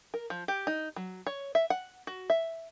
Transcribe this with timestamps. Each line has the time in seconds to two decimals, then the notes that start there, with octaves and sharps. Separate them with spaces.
0.14 A#4
0.30 F3
0.48 G4
0.67 D#4
0.96 F#3
1.27 C#5
1.55 E5
1.70 F#5
2.07 F#4
2.30 E5